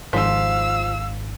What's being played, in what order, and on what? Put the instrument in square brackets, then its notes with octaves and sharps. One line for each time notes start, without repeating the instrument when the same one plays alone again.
[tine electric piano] G#1 G#2 B6 [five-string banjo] F3 C5 [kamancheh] F5 E6